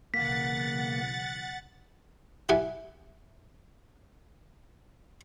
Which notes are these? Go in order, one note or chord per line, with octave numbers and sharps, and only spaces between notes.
B1 C#3 E3 A#3 F#5 A6 B6
E4 G4 E5 F#5 G#5